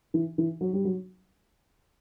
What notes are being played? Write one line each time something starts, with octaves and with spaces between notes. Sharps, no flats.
E3
E3
F#3
G3
F#3